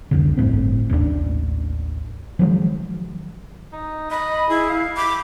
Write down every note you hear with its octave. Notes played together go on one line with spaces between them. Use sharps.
C2 F2 D3
G1 A2 C4
A1 D#2 A3 D4
D#3 F3 F#3 G#3
D#4
D#5 B5
E4 G#4
F5
B5 D6